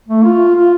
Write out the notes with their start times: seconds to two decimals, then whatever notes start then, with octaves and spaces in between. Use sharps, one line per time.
0.08 A3
0.25 F4
0.55 F4